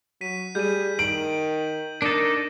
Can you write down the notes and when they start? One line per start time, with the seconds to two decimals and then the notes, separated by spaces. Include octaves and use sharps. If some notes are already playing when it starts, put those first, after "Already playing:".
0.21 F#3 B6 D#7
0.55 G3 G#4 G6 D#7
0.99 D#3 D7 F#7
2.02 D4 D#4 A4 A#4